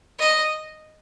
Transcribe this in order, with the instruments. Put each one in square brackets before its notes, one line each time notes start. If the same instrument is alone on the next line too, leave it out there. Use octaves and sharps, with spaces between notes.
[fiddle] D#5